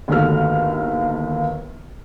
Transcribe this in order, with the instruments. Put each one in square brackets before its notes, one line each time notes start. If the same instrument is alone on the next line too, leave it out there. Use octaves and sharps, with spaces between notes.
[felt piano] G1 D#2 A3 F#4 F6